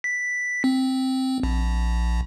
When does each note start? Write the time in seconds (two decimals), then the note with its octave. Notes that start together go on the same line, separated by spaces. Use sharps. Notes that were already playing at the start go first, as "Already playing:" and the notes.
0.04 B6
0.64 C4
1.43 A#1